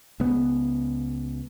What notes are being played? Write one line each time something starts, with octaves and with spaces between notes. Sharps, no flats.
C#2 B3